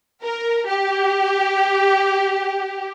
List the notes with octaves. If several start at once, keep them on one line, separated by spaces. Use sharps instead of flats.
A#4
G4